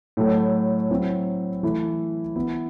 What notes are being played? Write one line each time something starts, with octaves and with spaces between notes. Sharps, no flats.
A2 F#3 A3
F#3 C4 E4
E3 A3 E4
E3 B3 E4